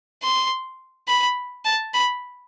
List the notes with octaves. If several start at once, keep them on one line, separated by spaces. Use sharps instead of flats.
C6
B5
A5
B5